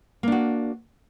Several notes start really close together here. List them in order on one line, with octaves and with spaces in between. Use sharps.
A#3 D4 F#4